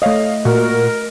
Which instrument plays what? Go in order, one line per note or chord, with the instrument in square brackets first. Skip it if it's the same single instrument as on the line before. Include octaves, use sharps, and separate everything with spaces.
[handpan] A3 D#5 [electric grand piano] C#5 F5 D#6
[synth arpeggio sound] A#2 [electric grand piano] F#4 [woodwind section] A#4